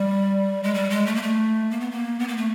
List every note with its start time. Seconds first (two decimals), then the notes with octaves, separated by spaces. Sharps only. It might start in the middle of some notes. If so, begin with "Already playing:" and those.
Already playing: G3
0.63 G#3
0.74 G3
0.90 G#3
1.06 A3
1.15 A#3
1.22 A3
1.71 A#3
1.80 B3
1.91 A#3
2.19 B3
2.28 A#3
2.37 A3